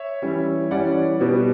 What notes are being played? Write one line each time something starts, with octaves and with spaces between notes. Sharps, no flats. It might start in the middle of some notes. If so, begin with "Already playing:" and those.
Already playing: C#5 E5
E3 G3 C#4
E3 G3 C#4 D5 F#5
B2 G3 B3